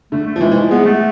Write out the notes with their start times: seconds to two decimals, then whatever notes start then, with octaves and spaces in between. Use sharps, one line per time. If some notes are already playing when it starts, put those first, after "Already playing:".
0.12 D3 A3
0.27 A3
0.36 F3
0.41 E3 G#3
0.51 E3
0.61 F3
0.71 G#3 B3
0.85 A3